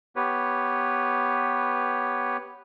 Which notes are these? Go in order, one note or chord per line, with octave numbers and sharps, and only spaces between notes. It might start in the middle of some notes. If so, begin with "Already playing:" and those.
B3 G4 B4 C#5